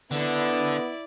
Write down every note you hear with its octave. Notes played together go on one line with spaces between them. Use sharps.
D3 B3 E4 A4 D5